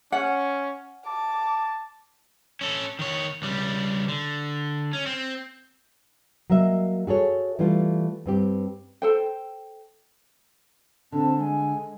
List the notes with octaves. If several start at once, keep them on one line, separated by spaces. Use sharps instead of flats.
C#4 F#5
A5 D6
C#4 A4
D#3 C#5
C#2 G3
D3
C#4
C4
F#3 A#3 D#5 E5
F#4 G#4 A4 C#5
E3 G3 A3 F4
G2 C4 G4
A4 C5 G5
D3 C4 A5
G#3 G#5